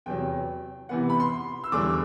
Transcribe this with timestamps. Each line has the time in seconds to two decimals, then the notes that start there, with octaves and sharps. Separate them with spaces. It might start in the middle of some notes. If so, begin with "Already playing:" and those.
0.06 E2 C3 F#3 G5
0.89 C3 E3 B3 F#5
1.10 B5
1.20 C6
1.64 E6
1.72 E2 D3 G3 D4 D6